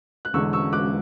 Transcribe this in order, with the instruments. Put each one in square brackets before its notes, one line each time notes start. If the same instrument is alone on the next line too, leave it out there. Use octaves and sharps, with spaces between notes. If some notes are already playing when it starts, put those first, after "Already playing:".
[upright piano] F#6
E1 E2 D3 G#3 C#6 E6
C#6 E6
D6 F#6